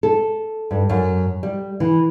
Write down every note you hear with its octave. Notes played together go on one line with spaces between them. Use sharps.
A4
G2
F#2
G3
E3